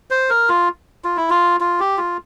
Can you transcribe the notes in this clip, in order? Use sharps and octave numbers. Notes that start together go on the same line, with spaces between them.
C5
A#4
F4
F4
E4
F4
F4
G4
F4